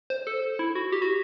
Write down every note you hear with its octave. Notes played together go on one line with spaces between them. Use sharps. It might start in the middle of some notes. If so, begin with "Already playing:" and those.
C5
A4
E4
F#4
G4
F#4